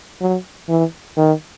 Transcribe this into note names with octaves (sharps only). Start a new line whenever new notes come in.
F#3
E3
D#3